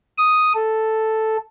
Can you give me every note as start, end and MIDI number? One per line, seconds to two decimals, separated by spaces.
0.18 0.53 87
0.55 1.37 69